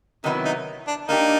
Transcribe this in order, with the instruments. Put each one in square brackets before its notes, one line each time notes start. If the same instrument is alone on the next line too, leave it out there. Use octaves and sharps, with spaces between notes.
[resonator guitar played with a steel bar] C3 D#3 F#3 B3 E4 [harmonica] D#4
[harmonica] D#4
D4
[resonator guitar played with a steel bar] A#3 D4 G4 [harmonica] D#4